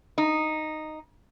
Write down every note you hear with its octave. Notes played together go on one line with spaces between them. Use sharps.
D#4